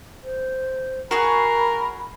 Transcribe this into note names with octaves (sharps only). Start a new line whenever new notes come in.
C5
F#4 G#4 A#4 B5